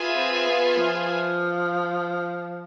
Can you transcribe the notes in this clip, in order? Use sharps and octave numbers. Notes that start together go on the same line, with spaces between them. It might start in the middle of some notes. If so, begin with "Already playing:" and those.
Already playing: F4 G#4 B4 E5 G#5
C4
B3
F3